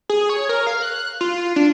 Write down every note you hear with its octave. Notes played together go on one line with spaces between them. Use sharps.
G#4
C#5
A#4
F5
F#6
F4
D4